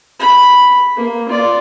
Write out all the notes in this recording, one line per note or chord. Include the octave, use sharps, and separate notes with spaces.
B5
A#3
F4 D5